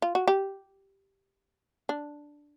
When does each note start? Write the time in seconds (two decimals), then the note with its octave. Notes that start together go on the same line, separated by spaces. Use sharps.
0.02 F4
0.15 F#4
0.28 G4
1.89 D4